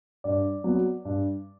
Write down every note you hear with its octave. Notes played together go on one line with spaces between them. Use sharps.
G2 D5
F#3 B3
G2